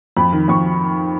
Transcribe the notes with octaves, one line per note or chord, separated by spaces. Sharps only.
F2 B5
D#3
F2 C#6